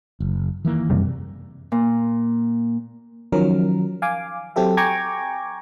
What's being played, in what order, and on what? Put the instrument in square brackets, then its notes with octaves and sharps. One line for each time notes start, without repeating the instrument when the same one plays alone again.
[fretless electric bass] F#1
D#3 E3 A#3
[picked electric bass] F#2 C3 G3
[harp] A#2
[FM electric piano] D#3 F3 F#3 C#4 A#4
F5 G#5 D6
F#3 C4 G4 A4 E5
G5 G#5 A#5 C#6 D6 G#6